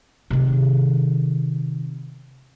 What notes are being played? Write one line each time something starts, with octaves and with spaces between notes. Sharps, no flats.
C3 D#3